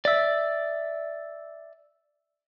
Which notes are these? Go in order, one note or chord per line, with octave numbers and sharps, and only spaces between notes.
D5 E5